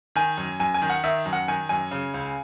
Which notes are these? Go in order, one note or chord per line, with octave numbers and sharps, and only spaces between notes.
D#3 G#5
F#2
F#2 G#5
G#5
D#3
F#5
D#3 E5
F#2
F#5
D#3 G#5
F#2 G#5
C#3
C#2